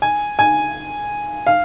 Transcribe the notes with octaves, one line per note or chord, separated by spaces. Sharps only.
G#5
G#5
F5